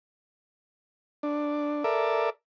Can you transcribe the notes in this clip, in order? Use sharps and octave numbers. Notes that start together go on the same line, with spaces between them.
D4
A4 A#4 D5 E5